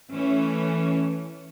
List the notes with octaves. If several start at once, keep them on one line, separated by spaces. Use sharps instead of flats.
E3 A3 C#4